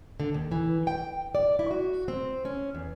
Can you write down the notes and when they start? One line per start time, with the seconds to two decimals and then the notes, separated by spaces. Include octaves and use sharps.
0.20 D3
0.34 D#2
0.52 E3
0.87 G5
1.35 D5
1.59 E4
1.71 F#4
2.08 C4
2.45 C#4
2.75 E2